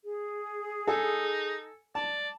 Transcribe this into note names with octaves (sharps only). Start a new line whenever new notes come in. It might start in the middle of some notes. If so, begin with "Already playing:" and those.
G#4
D#4 A4 G#5
D5 A5